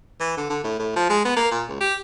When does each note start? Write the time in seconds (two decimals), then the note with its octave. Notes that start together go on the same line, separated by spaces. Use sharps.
0.20 E3
0.37 D3
0.49 D3
0.64 A2
0.79 A2
0.96 F3
1.09 G#3
1.25 B3
1.36 A#3
1.51 A#2
1.69 C#2
1.80 G4